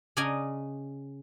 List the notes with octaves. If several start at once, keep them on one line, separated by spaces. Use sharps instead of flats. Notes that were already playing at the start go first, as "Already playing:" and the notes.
C#3 C#4 D5 D#5 G#5 A#5